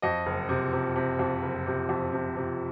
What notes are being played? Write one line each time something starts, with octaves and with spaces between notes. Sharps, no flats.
F2 D#5
F#1
C3
C3
C3
F2
F#1
C3
F2
C3
C3